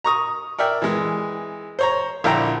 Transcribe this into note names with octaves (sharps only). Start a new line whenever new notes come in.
A#5 C#6 D#6
A#4 D5 E5 G5
E3 G#3
C5 C#5 A#5
A#1 D3 E4 A4 G5 A#5